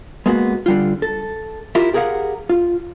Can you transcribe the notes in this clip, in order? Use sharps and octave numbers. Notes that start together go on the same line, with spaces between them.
G#3 A#3 B3 F#4
D3 G3 F4
A4
E4 F4 G4 A#4
G4 G#4 A#4 D5 F5 F#5
F4